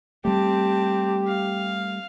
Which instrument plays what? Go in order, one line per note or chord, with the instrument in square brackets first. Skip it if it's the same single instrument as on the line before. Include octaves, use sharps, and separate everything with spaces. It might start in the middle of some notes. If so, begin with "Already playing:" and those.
[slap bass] G3 A3 [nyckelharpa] C4 A5 [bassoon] G4
[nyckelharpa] F5